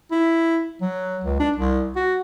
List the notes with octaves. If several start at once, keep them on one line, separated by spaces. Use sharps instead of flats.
E4
F#3
C#2
D4
C2
F#4